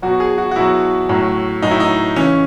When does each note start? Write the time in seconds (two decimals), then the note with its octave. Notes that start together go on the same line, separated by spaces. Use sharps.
0.02 B2 F#3 F#4
0.20 G#4
0.38 F#4
0.51 F#4
0.56 B2 F#3 E4
1.09 A2 F#3
1.62 A2 F#3 D#4
1.71 E4
1.80 D#4
2.16 C#3 E3 C#4